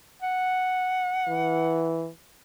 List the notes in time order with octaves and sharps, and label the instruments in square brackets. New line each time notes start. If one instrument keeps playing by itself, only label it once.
[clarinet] F#5
[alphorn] E3